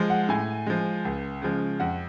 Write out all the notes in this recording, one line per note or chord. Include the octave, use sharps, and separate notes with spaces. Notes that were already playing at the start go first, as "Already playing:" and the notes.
Already playing: F3 G#3
F#5
A2 G#5
F3 G#3
C#2
C#3 F3 G#3
F2 F#5